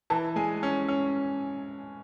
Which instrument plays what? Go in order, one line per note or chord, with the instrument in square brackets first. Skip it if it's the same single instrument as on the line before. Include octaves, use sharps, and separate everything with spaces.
[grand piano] E3 [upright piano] A5
[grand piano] G#3 [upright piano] G#5
[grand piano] C#4
C#4